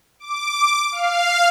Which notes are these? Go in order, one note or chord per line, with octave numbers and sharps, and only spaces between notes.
D6
F5